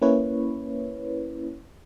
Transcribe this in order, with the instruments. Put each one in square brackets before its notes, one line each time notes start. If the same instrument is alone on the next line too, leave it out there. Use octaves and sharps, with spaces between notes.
[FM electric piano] A#3 C#4 E4 B4 C#5